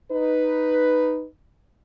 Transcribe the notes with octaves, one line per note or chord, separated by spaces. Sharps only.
D#4 B4